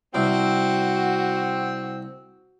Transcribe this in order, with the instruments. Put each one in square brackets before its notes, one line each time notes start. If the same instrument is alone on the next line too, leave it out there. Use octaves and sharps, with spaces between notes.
[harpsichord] C2 [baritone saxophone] C4 [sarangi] F#4